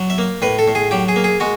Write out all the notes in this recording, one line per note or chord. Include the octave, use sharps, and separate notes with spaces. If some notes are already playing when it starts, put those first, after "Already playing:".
Already playing: F#3
E5
A#3
A2 B4
A4
A2
G#4
F#3 G4
G#4
A#3
G#4
G#3 F#4